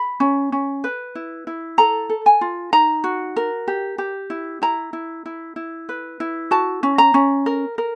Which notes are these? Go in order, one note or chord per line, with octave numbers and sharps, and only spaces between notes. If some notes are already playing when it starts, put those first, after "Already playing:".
Already playing: B5
C#4
C#4
B4
E4
E4
A4 A#5
A4
G#5
F4
D#4 A#5
F#4
A#4
G4
G4
E4
E4 A#5
E4
E4
E4
B4
E4
F#4 A5
C#4
A#5
C#4
A#4
A#4